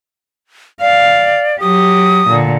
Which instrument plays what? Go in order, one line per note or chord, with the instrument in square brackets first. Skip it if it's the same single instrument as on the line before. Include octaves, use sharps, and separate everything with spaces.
[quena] D5 [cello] F5
[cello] F#3 G4 [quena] D#6
[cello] A#2 D3